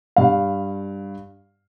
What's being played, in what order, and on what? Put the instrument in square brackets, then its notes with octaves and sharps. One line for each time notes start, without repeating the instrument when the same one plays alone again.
[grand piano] G2 F5